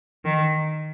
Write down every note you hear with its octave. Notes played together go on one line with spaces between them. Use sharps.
D#3